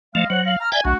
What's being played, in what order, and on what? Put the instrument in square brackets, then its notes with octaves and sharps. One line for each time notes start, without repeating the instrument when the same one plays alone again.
[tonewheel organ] F3 A3 [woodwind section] G#3 D#5 F5
[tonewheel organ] F#3 [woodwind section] C5 C#5 F#5
[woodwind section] F5
A#5 F6
[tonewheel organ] D5 E5 G5 [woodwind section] G#5
[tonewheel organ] B1 [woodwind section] A3 D4 F#4